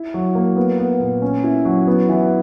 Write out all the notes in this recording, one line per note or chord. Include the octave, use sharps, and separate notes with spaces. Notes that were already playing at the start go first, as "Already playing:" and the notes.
Already playing: E4
F#3
A#3
B3
B3
A#2
C#4
E4
F#3
B3
E3